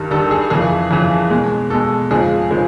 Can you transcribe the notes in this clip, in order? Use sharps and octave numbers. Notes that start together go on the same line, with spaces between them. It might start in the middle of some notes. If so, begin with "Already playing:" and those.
Already playing: G2 D#3 G3
G2 D#3 G3 A4
G#4
F2 C#3 E3 G#4
F2 C#3 E3
B2 G#3
B2 G#3 A4
F2 C#3 F3 G#3 G#4
C#3 F3 G#3